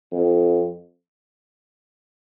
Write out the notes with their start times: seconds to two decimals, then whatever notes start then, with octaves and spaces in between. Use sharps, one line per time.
0.12 F2